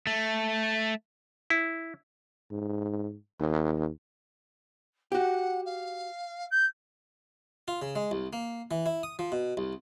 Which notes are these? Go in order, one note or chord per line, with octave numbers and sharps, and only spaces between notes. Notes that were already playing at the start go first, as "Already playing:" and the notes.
A3
E4
G#2
D#2
F#4 G4 F#5
F5
G6
F4
C#3
G#3
C2
A#3
E3
E4
D#6
F3
B2
C2